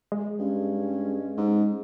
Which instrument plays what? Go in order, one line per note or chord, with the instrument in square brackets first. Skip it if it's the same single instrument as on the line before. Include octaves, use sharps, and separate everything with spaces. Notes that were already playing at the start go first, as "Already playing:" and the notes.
[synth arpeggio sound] G#3
[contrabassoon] G2 [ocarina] C#4
[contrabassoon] G#2